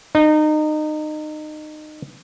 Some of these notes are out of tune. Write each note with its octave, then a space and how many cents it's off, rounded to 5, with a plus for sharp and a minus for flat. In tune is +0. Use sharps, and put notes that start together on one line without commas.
D#4 -25